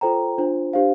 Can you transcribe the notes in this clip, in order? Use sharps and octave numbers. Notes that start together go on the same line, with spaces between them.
F4 A4 C5 G5 A#5
D4 F4 C5
D4 G4 C5 F5